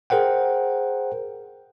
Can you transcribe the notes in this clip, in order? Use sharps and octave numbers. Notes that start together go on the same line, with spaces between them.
G#4 A#4 C5 F#5 G5